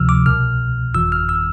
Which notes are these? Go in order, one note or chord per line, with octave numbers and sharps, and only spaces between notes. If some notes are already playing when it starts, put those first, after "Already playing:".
Already playing: D2 C3 F3 E6 F6
D6
C2 B2 F6
G1 F2 E3 E6
F6
E6